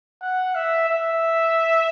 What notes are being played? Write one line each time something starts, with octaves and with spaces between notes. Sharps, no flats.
F#5
E5
E5